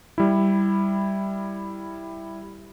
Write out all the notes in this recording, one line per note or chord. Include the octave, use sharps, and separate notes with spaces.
G3 E4